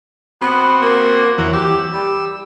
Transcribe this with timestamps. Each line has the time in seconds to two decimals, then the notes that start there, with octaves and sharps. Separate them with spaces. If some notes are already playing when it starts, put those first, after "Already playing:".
0.42 B3 C4 F#4
0.82 A#3
1.38 E2 E3 F#3 F#4
1.53 G4 E6
1.93 G3